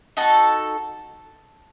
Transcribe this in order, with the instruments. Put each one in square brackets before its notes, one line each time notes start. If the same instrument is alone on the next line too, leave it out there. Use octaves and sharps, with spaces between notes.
[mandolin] D#4 F#4 A4 A5